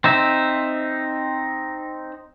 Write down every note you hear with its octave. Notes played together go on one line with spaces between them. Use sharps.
C4 D#4 E5